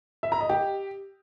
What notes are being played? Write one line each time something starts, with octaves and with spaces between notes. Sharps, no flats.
E5
A#5
D#5
G4